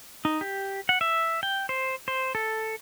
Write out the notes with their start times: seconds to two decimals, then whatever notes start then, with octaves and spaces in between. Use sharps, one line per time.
0.25 D#4
0.41 G4
0.89 F#5
1.01 E5
1.43 G5
1.69 C5
2.08 C5
2.35 A4